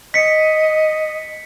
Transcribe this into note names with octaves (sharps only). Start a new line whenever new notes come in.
D#5 B6 C#7